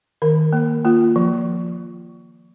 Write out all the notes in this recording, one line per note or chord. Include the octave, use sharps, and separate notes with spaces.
D#3 A#4
A#3
A#3 F4
F3